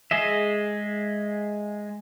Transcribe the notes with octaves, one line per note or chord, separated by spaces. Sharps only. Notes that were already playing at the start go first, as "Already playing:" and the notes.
G#3 G#4 D#5 E5